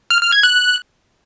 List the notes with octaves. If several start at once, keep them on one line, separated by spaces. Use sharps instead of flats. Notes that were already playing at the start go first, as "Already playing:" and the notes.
F6
F6
G#6
F#6